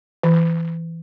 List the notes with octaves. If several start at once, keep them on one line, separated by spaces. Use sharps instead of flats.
E3